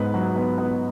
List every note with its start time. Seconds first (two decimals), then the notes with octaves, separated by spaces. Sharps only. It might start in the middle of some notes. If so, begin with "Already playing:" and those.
Already playing: G#2 B3 B4
0.14 F#3
0.36 B3
0.58 B3